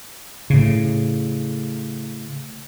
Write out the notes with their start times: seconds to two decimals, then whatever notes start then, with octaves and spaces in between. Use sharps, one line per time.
0.50 A2 C#3